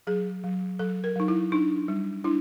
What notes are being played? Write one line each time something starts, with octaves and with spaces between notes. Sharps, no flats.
F#3 G#4
F#3
F#3 A4
A#4
F#3 D#4
E4
D4 D#4
G3
D4 E4